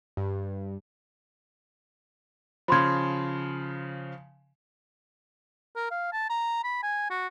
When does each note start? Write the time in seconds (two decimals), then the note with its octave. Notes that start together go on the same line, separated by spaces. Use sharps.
0.17 G2
2.68 C#3 F3 B5 C6 G#6
5.76 A#4
5.91 F5
6.13 A5
6.30 A#5
6.64 B5
6.83 G#5
7.10 F#4